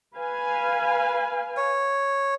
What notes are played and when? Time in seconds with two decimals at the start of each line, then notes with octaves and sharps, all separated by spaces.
0.17 B4 F5 G#5
1.57 C#5